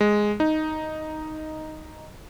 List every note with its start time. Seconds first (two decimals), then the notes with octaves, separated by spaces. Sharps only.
0.01 G#3
0.40 D#4